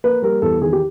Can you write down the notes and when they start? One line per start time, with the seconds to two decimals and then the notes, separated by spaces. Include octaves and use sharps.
0.04 A#3 B4
0.22 G3 A#4
0.42 E2 A4
0.62 D#3 G#4
0.73 G4